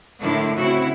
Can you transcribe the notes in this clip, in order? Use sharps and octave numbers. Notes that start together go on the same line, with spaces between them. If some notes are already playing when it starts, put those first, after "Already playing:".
A2 D3 D#3 D4 E4
C#3 C4 E4 F#4